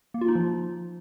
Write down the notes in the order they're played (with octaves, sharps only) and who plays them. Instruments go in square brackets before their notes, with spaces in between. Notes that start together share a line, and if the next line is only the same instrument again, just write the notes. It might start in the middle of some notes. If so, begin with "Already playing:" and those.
[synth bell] A#3
F4
D#4
F3